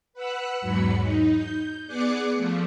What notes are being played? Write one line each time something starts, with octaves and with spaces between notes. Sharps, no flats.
B4 F#5 E6 F#6
E2 G#2 F#3 B5 C#7
D#4
G6
B3 G#4 D5 D6 F#6 C#7
F3 A3